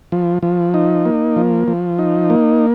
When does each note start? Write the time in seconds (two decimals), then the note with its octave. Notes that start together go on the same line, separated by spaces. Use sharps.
0.12 F3
0.43 F3
0.74 D#4
1.06 A#3
1.36 F3
1.68 F3
1.99 D#4
2.30 A#3